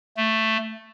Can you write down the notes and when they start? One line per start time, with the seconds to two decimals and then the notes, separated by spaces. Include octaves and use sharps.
0.17 A3